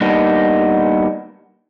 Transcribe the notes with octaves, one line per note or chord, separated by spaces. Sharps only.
G3 A#3 B3 D4 D#4